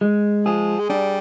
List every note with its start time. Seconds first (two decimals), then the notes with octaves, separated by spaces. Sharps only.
0.01 G#3
0.46 F3 G#4
0.79 G#3
0.90 G3 D4